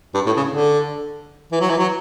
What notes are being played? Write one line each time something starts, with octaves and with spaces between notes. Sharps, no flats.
G2
A2
C#3
D3
E3
F#3
E3
F#3